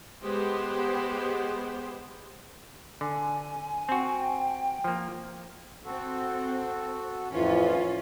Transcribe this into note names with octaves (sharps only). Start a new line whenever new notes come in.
G#3 B3 G4 C5
D3 G#5
C4 F#4 G5
F3 A#3
C4 F#4 A4
F2 A2 E3 C#4 F4